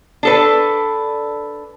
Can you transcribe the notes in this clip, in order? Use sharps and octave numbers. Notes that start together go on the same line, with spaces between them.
D4 A4 B4